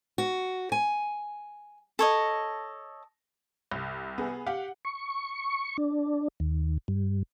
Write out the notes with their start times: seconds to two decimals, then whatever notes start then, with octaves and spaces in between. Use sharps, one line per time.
0.18 F#4
0.72 G#5
1.99 A4 C#5 D#5
3.72 C2
4.18 B3 G#4
4.47 G4 F5 F#5
4.85 C#6
5.78 D4
6.40 D#2
6.88 G2